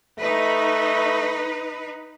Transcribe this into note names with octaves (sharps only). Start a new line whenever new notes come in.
A3 D#4 B4